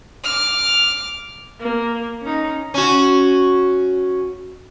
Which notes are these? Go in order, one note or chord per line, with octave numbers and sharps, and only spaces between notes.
D6 F6
A#3
C#4 D#4
C#4 F#4